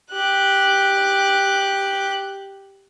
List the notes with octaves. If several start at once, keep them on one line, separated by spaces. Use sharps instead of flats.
G4 F#6